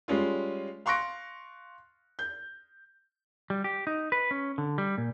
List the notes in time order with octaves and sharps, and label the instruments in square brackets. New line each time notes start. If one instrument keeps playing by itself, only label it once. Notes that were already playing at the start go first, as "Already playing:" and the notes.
[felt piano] G3 G#3 C#4 F4
F5 C6 C#6 F#6 A#6 D7
G6
[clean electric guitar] G3
G4
D#4
B4
C#4
D3
G3
A#2